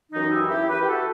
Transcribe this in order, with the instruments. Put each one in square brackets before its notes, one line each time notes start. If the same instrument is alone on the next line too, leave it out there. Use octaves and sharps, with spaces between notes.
[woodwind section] F#2 E3 D#4
E4 G4
E4 G4
G4 B4
G4
F#4 A4